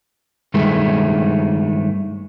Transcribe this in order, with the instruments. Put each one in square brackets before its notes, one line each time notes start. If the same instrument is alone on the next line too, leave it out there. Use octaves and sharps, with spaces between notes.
[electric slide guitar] G2 D#3 G#3 A3